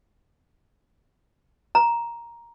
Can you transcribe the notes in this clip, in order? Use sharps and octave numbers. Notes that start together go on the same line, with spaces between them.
A#5